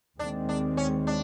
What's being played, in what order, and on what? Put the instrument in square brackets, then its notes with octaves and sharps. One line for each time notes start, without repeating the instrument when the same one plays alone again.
[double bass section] D#2 D#3 G#3 C4 [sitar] D4
[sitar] D4
C#4
D4